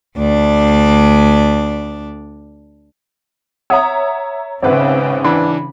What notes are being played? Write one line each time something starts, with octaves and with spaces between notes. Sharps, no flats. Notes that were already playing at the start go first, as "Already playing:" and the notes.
D2 D4 D5
C#5 E5 F#5 A#5 D#6
G#1 C#3 C4 B4 C5 E5 F#5
E3 D4 B5